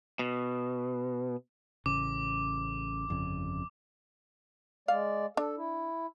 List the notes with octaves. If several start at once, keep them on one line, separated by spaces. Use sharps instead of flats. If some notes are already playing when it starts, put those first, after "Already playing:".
B2
A1 C#3 D6
G1 F2 C#3
G#3 D5 F5
D4 A4
E4